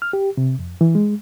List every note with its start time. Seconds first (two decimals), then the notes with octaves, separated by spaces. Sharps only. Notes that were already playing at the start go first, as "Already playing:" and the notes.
0.02 F6
0.13 G4
0.37 C3
0.59 F2
0.81 E3
0.95 G#3